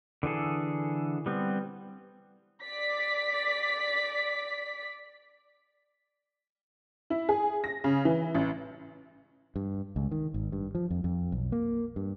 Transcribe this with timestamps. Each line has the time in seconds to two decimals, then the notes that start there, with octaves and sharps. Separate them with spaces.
0.23 D3 E3 G#4 A4
1.26 G3 B3 C4
2.62 D5 B6
7.10 E4
7.29 G#4
7.64 A#6
7.84 C#3
8.05 E3
8.35 A1
9.56 G2
9.96 C#2
10.11 D#3
10.34 G#1
10.52 G2
10.75 F3
10.90 F2
11.04 F2
11.32 B1
11.52 A#3
11.96 G2